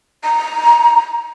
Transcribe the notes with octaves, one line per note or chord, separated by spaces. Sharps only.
A#5